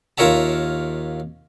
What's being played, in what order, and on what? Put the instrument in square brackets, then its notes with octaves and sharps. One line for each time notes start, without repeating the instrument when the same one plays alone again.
[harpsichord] D#2 F4 A#4 C#5 E5 A5